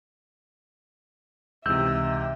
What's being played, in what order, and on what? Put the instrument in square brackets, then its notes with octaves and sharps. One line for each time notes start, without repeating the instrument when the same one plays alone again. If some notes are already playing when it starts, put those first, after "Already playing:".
[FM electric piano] C#2 E3 G5 [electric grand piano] G#2 C3 [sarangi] E5 [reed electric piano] E6 G6